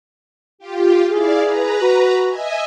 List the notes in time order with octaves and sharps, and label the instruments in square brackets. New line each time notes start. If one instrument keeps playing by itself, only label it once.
[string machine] F4 G4
[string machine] E4 D5 F5 [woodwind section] G#4
[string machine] B4 A#5
[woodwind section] F#4
[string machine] D#5 E5 G#5